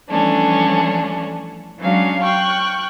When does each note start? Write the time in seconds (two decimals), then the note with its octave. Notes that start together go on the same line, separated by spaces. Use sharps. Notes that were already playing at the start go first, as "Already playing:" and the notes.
0.10 E3 F3 G3 A3 C#4 D4
1.79 F#3 G#3 C#4 D4 F5
2.23 G5 C#6 F6 F#6